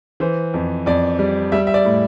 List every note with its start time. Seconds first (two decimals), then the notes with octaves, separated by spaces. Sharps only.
0.20 E3 C5
0.54 F2
0.86 F2 D5
1.19 G3
1.52 G3 E5
1.67 E5
1.74 D5
1.85 A2